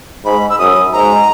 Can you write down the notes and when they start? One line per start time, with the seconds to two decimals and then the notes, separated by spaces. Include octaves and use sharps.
0.25 G#2 B5
0.49 E6
0.59 F#2 D#6
0.93 G#2 A#5